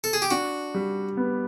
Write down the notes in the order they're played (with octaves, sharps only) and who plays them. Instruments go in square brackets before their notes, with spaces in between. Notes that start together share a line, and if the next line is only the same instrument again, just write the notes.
[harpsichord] A4
G#4
G4
[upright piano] D4 [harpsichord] F#4
[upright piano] G3
B3